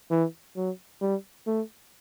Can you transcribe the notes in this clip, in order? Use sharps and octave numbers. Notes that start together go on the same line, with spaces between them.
E3
F#3
G3
A3